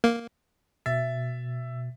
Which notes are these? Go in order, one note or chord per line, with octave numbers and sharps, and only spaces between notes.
A#3
B2 E5 A6